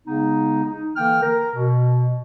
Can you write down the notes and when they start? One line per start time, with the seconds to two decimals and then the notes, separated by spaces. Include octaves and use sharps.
0.06 C#3 G#3 B3 D#4
0.63 D#4
0.96 D3 E3 A#3 G5 F6
1.22 A#4
1.55 B2